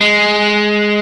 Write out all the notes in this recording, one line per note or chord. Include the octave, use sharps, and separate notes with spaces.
G#3